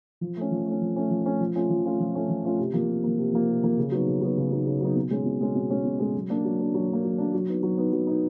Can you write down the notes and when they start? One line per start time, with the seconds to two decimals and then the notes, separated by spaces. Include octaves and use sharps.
0.21 F3
0.37 A3 C#4
0.51 F3
0.66 A3
0.71 C#4
0.81 F3
0.96 A3 C#4
1.10 F3
1.25 A3 C#4
1.40 F3
1.55 A3 C#4 F4
1.70 F3
1.85 A3 C#4 F4
2.00 F3
2.14 A3 C#4 F4
2.29 F3
2.44 A3 C#4 F4
2.59 C3
2.73 F3 A#3
2.89 C3
3.04 F3 A#3
3.18 C3
3.33 F3 A#3
3.48 C3
3.63 F3 A#3
3.78 C#3
3.92 F#3 B3 D#4
4.07 C#3
4.21 F#3 B3 D#4
4.37 C#3
4.51 F#3 B3 D#4
4.66 C#3
4.81 F#3 B3 D#4
4.96 B2
5.11 G#3 C#4
5.25 B2
5.41 G#3 C#4
5.55 B2
5.70 G#3 C#4
5.85 B2
5.99 G#3 C#4
6.15 F#3
6.30 A#3 D4
6.45 F#3
6.59 A#3 D4
6.74 F#3
6.89 A#3 D4
7.04 F#3
7.18 A#3 D4
7.34 F#3
7.48 B3 D#4
7.63 F#3
7.78 B3 D#4
7.92 F#3
8.07 B3 D#4